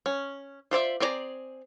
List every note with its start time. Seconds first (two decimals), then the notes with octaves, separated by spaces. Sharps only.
0.06 C#4
0.71 F4 C5 D5 E5
1.00 C4 G#4 C#5 D5 A#5